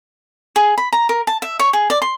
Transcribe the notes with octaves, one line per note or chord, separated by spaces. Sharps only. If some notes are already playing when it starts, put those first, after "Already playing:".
G#4
B5
A#5
A#4
A5
E5
C#5
G#4
D5
C6